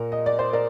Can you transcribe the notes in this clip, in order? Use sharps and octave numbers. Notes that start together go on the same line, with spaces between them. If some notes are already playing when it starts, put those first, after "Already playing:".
Already playing: A#2 A#4
D#5
D5
C5
A#4 D5